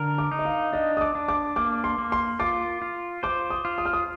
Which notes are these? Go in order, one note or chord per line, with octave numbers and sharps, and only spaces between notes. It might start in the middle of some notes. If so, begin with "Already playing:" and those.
Already playing: D3 A#4
D6
D#4
D#5
F5
D4 D#5
D#6
D6
D4
D6
A#3 D6
C6
A#3
C6
F4 D6
F4
C5 D6
D#6
F4
D#6
F6
D#6